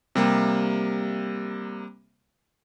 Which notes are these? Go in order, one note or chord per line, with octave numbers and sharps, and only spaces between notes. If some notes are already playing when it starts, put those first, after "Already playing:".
C3 G3 A#3